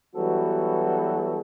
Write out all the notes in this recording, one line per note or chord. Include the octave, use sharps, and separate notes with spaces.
E3 F#3 G3 B3 F#4 A4